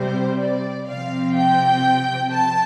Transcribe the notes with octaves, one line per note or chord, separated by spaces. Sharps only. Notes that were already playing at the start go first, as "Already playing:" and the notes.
Already playing: C3 G3 C4 C5
D5
C3 F3 C4 F5
G5
A5